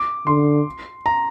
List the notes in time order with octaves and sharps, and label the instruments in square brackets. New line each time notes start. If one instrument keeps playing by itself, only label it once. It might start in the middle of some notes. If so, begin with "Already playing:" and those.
Already playing: [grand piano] D6
[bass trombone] D3 [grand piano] C6
[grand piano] A#5